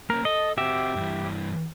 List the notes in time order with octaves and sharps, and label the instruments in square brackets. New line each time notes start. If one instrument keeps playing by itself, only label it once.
[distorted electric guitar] A#3 C#4 [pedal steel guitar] A#4
[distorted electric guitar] A4 [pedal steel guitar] D#5
[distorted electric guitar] C4 F#4 [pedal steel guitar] G4 E5
[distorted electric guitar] G2 E3